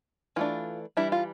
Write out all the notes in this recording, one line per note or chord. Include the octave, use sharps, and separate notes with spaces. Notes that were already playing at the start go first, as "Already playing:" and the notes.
E3 A3 D4 F4
E3 G3 D4 E4
F4